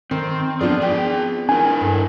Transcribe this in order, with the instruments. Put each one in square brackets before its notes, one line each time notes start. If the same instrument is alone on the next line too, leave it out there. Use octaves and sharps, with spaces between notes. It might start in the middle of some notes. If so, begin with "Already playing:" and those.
[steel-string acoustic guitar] D#3 [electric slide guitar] C4
[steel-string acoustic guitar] B3 F4 D5 [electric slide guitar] D4 G#4
[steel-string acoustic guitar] F3 B3 C4 [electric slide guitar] G#4 G5
[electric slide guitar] D4 E4 A#4 [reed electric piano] G#5
[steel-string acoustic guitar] G2 A4